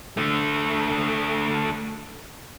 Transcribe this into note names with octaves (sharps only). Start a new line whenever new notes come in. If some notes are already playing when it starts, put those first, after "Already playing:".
D3 A3